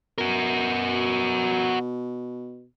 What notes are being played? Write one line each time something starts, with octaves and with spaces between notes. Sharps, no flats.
B2 F#4 A#4